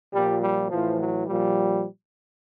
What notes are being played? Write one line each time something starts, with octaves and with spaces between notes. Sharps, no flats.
A#2 F3 G3
G3
A2 E3 F3
F#3
A#2 F3 G3